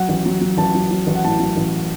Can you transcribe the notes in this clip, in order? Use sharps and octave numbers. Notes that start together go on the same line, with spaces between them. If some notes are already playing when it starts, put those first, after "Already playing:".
Already playing: F#3 F#5
A1
F#3
F#3
A1 A5
F#3
F#3
A1
F#5
A2 A5
F#3
A1